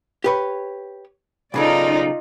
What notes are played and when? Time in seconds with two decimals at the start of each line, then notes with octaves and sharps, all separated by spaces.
0.24 G4 B4 C#5
1.54 B1 C#3 D#4 F4 A4 D5